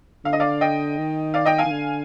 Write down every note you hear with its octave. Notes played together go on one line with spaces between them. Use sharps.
D3 F5
D#5
D5 F5
D#5 G5
D#3
D5 F5
D#5 G5
F5 G#5
D#3
D3